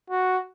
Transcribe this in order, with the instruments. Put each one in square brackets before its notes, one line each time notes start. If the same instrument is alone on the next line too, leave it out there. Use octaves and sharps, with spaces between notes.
[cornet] F#4